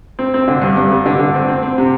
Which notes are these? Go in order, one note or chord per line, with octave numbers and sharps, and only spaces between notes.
C4
C4
D3
G2
G2
G3
D3
D3
C4
C4
C4
C3